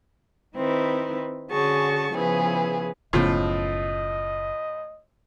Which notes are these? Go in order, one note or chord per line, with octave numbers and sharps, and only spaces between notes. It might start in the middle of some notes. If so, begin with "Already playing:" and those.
D#3 C4 D#4 E4 B4
D3 C#4 F#4 G#4 A5 C#6
C#3 F3 B3 E4 G#4 B4
F#1 A2 C#3 F3 B3 D#5